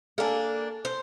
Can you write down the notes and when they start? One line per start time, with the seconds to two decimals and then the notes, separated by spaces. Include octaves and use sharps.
0.18 A#3 D4 A4 G#5
0.85 C5